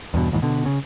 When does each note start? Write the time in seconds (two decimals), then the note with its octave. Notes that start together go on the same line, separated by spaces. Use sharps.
0.14 E2 G2 B2
0.31 A#1 D#2 G#2 E3
0.42 B2 D3
0.66 C#3